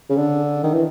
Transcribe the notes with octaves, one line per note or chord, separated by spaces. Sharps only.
C#3
D3
D#3
E3